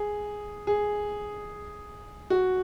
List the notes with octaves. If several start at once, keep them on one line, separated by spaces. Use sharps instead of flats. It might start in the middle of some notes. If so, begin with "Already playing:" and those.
Already playing: G#4
G#4
F#4